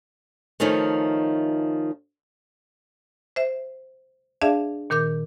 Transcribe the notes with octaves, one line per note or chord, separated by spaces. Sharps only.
D#3 F3 A3 C#4 D#4
C5 E5
D4 G#4 D5 E5 F5 A5
A#2 D#3 A#4 D6 G6